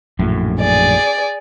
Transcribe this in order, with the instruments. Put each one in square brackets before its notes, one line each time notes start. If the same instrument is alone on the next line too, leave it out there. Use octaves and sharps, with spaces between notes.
[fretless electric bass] A#1 F#2 A2
[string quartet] G#4 D5